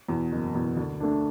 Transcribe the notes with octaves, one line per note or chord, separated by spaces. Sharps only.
E2 B2
F#1
E2 B2
D2
D3 A3 D4